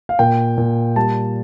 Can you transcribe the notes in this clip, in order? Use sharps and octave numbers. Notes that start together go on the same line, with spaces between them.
F5
A#2 G5
A#2
G3 A5